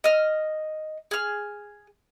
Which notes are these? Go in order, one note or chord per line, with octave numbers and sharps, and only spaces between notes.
D#5 F6
G#4 F6